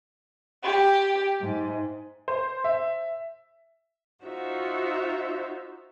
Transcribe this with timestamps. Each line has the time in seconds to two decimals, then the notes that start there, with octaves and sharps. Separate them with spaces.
0.64 G4
1.41 G#2
2.28 C5
2.64 E5
4.24 D#4 F4 F#4 C5 E5